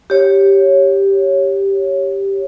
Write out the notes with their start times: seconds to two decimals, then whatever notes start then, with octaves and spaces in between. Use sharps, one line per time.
0.10 G4 C#5